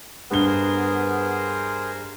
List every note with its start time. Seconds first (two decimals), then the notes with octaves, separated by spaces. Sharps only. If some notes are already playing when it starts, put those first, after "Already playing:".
0.31 G2 B3 G#4 A#4 C5 G7